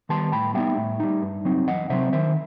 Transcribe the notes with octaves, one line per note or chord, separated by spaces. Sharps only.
D#3 G3 B3 A5 C6
A2 G5 B5
G3 B3 D#4 E5 G5
A2
G3 D#4
G2
F#3 C4 D#4
E2 D#5 F#5
C3 F#3 C4 C5 E5
D#3 C5 E5